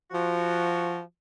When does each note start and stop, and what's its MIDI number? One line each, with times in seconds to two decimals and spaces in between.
0.11 0.99 53
0.11 0.99 66